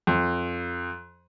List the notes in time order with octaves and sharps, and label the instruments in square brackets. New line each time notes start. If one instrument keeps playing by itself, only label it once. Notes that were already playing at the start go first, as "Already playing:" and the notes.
[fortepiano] F2